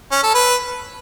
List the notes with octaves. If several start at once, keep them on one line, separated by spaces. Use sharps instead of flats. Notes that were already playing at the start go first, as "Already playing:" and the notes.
C#4
A4
B4